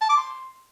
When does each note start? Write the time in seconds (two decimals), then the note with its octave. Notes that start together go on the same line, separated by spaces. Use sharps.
0.01 A5
0.09 D6
0.17 C6